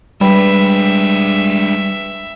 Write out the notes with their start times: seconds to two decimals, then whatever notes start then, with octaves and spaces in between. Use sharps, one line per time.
0.21 G3 G#3 D4 B4 E5 G5 B5